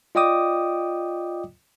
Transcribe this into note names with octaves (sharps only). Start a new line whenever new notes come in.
F4 D5 D#5 G5 D6 D#6